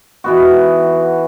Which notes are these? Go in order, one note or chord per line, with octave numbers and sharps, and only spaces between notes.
E3 B3 F#4